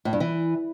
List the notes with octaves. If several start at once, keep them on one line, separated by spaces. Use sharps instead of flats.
A2
G2
E3